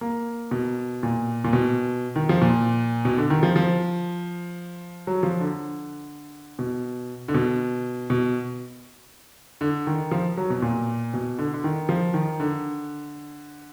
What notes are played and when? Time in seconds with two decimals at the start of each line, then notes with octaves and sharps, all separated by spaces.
0.01 A#3
0.51 B2
1.03 A#2
1.44 A#2
1.53 B2
2.16 D#3
2.29 F3
2.41 A#2
3.05 B2
3.17 D3
3.30 D#3
3.43 F3
3.56 F3
5.07 F#3
5.23 F3
5.40 D3
6.59 B2
7.28 D3
7.34 B2
8.10 B2
9.61 D3
9.87 D#3
10.11 F3
10.37 F#3
10.50 B2
10.62 A#2
11.13 B2
11.38 D3
11.53 D3
11.64 D#3
11.89 F3
12.14 D#3
12.40 D3